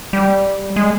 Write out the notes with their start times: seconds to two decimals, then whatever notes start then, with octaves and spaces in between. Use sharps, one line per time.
0.13 G3
0.76 G#3